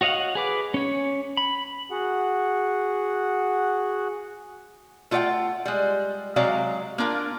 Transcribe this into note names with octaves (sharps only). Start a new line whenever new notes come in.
F#4 C#5 D#5 F5 F#5
G#4 B4 D6
C#4 C#5
B5
F#4 G#4 F#5
A3 F4 C#5 D5 F#5 G5
G3 G#3
C3 F#3 G#3 D5 F5 A#5
A#3 D4 F4 A#4